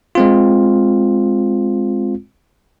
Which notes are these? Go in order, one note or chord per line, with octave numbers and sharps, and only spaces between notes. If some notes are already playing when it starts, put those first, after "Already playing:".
G#3 C4 F4